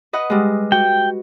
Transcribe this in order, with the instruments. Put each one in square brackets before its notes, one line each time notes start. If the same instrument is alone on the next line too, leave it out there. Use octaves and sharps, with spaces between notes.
[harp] B4 D#5 F#5
G3 G#3
[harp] F#4 [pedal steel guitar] G5